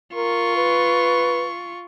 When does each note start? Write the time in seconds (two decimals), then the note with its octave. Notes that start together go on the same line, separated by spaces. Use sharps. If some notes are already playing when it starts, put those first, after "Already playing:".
0.15 F4 A#4 C#6
0.57 B4